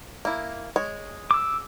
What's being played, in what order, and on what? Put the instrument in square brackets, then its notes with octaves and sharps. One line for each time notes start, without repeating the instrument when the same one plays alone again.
[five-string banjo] A#3 E4
G#3 C#5
[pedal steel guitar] D6 E6